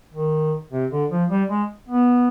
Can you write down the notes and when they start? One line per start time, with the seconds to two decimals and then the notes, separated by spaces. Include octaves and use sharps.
0.13 D#3
0.72 C3
0.91 D3
1.11 F3
1.30 G3
1.50 G#3
1.88 B3